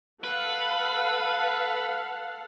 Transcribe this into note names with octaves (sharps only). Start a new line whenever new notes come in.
A4 B4 F5 F#5